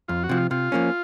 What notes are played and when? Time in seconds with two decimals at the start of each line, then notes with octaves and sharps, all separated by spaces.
0.08 F2 F4
0.23 F#4
0.29 C3 F3
0.37 F4
0.51 C3 F4
0.72 F3 A#3 C#4